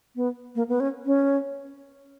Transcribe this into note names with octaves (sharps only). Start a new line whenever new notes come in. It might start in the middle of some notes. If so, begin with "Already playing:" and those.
B3
A#3
B3
C#4
C#4